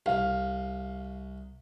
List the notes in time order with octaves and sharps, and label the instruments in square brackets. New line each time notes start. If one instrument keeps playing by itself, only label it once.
[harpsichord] C2 [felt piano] F5